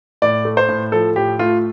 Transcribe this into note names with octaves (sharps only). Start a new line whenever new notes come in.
A2 D5
A3
C5
A2
F3 A4
A2 G4
A3 F4